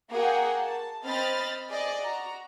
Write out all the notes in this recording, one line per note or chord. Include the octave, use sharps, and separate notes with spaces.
A#3 F#4 G#4 F#5 G5
A5
C4 D#5 B5 F6 A6
G#4 D5 D#5
F#4 A#5